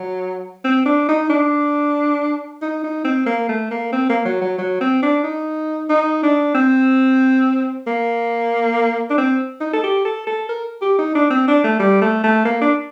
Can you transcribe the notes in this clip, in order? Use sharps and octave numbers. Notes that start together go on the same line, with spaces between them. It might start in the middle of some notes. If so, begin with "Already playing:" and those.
Already playing: F#3
C4
D4
D#4
D4
D#4
D#4
C4
A#3
A3
A#3
C4
A#3
F#3
F#3
F#3
C4
D4
D#4
D#4
D4
C4
A#3
D4
C4
D#4
A4
G4
A4
A4
A#4
G4
D#4
D4
C4
D4
A3
G3
A3
A3
A#3
D4